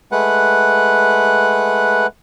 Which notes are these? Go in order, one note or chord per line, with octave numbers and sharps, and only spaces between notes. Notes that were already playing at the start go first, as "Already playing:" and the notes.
G#3 A3 B4 F#5